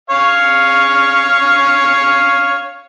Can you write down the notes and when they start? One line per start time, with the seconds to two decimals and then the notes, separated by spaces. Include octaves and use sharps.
0.10 C#5 F5 C#6